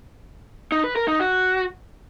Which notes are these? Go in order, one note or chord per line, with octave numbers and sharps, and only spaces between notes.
D#4
B4
A#4
D#4
F#4